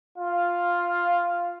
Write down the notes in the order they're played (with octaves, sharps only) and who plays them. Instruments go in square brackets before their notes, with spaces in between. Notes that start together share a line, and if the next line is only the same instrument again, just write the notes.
[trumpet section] F4 F5